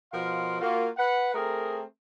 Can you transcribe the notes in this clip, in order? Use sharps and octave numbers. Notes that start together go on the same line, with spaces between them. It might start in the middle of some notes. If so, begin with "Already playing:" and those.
B2 F3 A#4 F5 F#5 C6
A#3 F4 F#4
B4 F#5
A3 C4 G#4 A#4